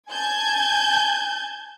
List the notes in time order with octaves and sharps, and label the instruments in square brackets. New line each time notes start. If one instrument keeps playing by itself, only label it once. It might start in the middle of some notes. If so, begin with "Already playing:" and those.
[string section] G#5 A5 G6 G#6